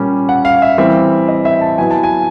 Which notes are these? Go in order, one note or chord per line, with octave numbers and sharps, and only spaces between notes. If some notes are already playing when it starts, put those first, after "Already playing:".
Already playing: A#2 G3 A#3 C#4
F#5
F5
E5
E3 G3 C4 E5
D#5
E5
A5
F#3 B3 E4 G#5
A5
G#5